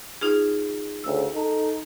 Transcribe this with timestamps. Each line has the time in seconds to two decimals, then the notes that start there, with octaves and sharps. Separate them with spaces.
0.21 D#4 F4 G#4
1.04 D2 C#3 E6
1.34 D#4 A4